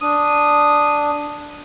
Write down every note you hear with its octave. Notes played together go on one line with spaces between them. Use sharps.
D4 D#6